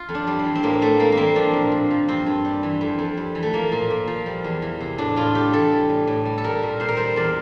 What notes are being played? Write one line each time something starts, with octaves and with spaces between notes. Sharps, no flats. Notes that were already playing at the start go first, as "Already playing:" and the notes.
Already playing: F4
F2
D4
G3
C4
E3
C4
A2 A#3
A2 A3
G3 A#3
A#3
E3 C4
F3 D4
A#2
A#2
F3
G2 C4
G2
G3
E3
F2
F2
G3
E3
A3
F3 A#3
A#2
A#2
F3
G3
E2
E3
C3
A2 D4
A2 F4
G3 G4
E3 A4
G3
A2
A2
G3
A4
G3 A#4
A#2
A#2 C5
A#4
G3 C5
E2 D5